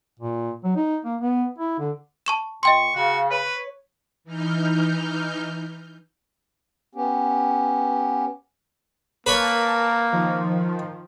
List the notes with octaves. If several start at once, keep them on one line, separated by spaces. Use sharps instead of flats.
A#2
F#3
D#4
A#3
B3
E4
D3
A5 C#6 E7
A#2 D#5 G5 C6 C#6
C#3 F#4 F5
B4 C#5
E3 D#4 F6 G6
B3 C#4 G4
A#3 A#4 B4 C#5 A5
D#3 F3